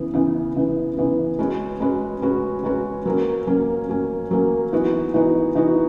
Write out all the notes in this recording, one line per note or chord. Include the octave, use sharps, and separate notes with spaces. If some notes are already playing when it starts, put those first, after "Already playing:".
Already playing: C#3 E3 B3
C#3 E3 B3
C#3 E3 B3
C#3 E3 B3
G#3 C#4 F#4 B4
G#3 C#4 F#4 B4
G#3 C#4 F#4 B4
G#3 C#4 F#4 B4
F#3 A#3 C#4
F#3 A#3 C#4
F#3 A#3 C#4
F#3 A#3 C#4
E3 B3 D#4 F#4
E3 B3 D#4 F#4
E3 B3 D#4 F#4